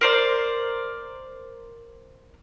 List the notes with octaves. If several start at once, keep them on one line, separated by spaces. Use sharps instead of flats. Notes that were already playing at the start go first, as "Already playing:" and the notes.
A#4 C5 D5